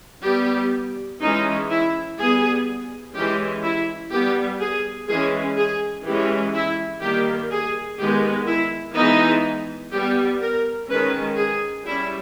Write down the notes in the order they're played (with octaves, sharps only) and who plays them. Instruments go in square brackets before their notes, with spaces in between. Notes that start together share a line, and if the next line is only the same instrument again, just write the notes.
[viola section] G3 B3 G4
E3 G#3 C#4 D#4
E4
G3 B3 G#4
E3 G#3 C#4 G4
E4
G3 B3 G4
G#4
E3 G#3 C#4 G#4
G#4
E3 G#3 C#4 G4
E4
D#3 G3 A#3 G4
G#4
D#3 G#3 B3 G4
E4
E3 G#3 B3 D#4
G3 B3 G4
A#4
D#3 G#3 C#4 B4
G#4
G3 C#4 E4